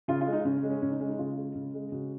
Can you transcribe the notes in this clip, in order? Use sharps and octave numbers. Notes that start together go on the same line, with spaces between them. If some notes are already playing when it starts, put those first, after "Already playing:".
C#3 F4
F4
G#3
D#4
C#3 C#4
C#4
G#3
C#4
C#3 C#4
D#4
G#3 C#4
D#4
C#3 F4
G#3
C#3
G#3
C#3 F#4